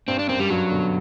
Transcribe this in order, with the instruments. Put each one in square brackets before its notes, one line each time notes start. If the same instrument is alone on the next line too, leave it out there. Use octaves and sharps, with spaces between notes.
[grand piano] G2 [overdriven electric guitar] C4
[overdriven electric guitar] D4
[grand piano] F#2 [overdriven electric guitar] C4
[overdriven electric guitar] G3
[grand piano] G2 [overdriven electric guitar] F#3
[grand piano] B2 D3